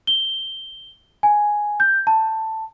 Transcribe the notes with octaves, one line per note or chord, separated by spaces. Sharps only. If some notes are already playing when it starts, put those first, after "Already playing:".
G7
G#5
G6
A5